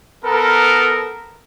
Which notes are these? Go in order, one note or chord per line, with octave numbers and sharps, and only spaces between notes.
B3 A4 A#4